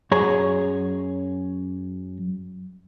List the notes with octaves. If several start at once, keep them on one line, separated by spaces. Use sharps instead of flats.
F#2 G#4 C#5 A#5